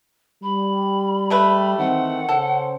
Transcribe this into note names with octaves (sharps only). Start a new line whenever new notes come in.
G3 B5
G#3 A3 B4
D#3 E3 C4 F#5
C#3 C#4 A4 C5